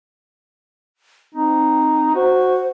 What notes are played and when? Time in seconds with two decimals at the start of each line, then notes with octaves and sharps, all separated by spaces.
1.35 C4 D#4
2.15 F#4 C5